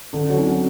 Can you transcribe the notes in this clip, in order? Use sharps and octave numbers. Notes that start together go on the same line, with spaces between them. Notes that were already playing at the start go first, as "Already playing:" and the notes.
D3 C#4
F#3
C4